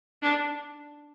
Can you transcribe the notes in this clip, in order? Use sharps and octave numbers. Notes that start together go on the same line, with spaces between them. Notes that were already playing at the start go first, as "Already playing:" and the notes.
D4